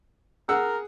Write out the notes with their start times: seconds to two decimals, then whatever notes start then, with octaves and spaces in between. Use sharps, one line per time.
0.49 G#4 A#4 F#5 E6